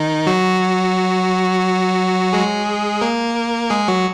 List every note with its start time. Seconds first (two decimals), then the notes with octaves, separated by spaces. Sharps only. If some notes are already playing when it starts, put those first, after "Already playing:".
Already playing: D#3 D#4
0.27 F#3 F#4
2.33 G#3 G#4
3.01 A#3 A#4
3.70 G#3 G#4
3.88 F#3 F#4